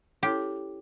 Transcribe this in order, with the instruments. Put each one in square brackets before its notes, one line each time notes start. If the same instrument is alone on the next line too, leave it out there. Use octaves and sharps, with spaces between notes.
[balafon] C#4 E4 A4 C#5 [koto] G4